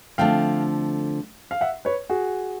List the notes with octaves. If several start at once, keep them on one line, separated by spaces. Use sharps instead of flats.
D3 F3 A3 C4 F5 G5
F5
E5 F#5
B4 C#5
F#4 G#4